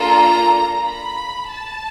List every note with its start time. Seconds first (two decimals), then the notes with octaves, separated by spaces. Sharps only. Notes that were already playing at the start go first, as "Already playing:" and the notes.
Already playing: A#3 D4 F4 A4 A#5
0.87 B5
1.53 A5